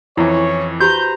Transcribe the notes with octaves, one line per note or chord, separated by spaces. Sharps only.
F2 E3 C#4 E4 C#5
F#4 G4 B4 C5 A#5 G6